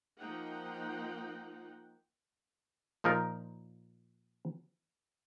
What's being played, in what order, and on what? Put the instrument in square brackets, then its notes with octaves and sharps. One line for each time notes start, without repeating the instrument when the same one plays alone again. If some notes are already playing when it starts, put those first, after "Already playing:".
[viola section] F3 A#3 D#4 F#5 G5
[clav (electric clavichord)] A#2 F3 D#4 F4 A#4